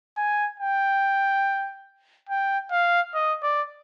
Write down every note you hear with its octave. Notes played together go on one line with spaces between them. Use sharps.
G#5
G5
G5
F5
D#5
D5